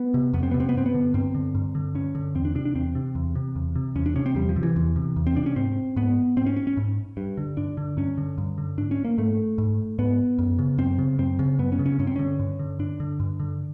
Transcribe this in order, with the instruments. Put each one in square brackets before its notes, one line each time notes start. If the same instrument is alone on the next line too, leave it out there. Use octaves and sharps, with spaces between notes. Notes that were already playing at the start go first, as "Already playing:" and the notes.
Already playing: [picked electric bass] B3
C3
F2 B3
C4
C3 B3
C4
B3
G2 C4
B3
D3
G2 C4
D3
G2
D3
G2 C#4
D3
E2 C4
D4
C3 D4
D4
E2 C4
C3
E2
C3
E2
C3
E2 C#4
D4
C3 C#4
C4
E2 G3
F3
C3
E3
E2
C3
E2
C4
C3 D4
C#4
G#2 C4
G#2 B3
G#2 C4
C#4
C#4
C#4
G#2
G2
D3
G2 D4
D3
G2 C#4
D3
G2
D3
G#2 D4
C#4
A#3
G#2 A3
G#2
G#2 B3
F#2
C#3
F#2 C4
C#3
F#2 C4
C#3
F#2 B3
C#4
C#3
C#4
G2 C#4
C4
D3 C#4
G2
D3
G2 D4
D3
G2
D3